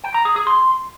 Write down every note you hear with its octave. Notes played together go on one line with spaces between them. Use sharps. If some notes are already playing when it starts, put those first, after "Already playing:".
G5
A#5
G#4
G#4
C6